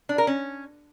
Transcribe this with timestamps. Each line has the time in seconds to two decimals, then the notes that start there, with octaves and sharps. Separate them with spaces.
0.09 D4
0.18 A#4
0.27 C#4